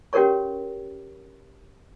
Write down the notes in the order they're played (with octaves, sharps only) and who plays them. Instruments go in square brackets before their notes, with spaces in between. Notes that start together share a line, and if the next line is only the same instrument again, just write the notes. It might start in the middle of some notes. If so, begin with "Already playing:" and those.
[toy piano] C#4 F#4 G4 A#4 C#5 C#6